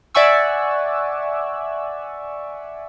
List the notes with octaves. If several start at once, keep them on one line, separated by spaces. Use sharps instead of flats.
D5 E5 F#5 G#5 C#6 E6